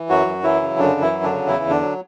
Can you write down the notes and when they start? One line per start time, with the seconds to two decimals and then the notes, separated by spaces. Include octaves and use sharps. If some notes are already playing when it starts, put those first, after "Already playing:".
Already playing: E3
0.09 F#2 F#3 F#4
0.27 F#2
0.43 E3 F#3 E4
0.62 C#3
0.79 F#2 D3 D4
0.96 F#2
1.01 E3 E4
1.12 F#3
1.24 D3 D4
1.30 C#3
1.47 E2 E3 E4
1.64 E2
1.70 D3 D4
1.81 F#3